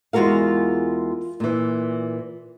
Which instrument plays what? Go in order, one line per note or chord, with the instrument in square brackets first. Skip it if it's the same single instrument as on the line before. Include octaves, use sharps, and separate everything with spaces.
[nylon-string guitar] E2 G#3 F4 F#4 A#4 F5
A#2 E3